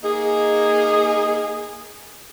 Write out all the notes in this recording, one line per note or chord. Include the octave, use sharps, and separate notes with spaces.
A#3 D#4 G#4